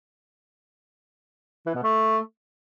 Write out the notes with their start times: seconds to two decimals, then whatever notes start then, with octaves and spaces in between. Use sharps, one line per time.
1.66 E3
1.74 B2
1.83 A3